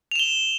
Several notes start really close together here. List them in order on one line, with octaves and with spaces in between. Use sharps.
F7 E7 G7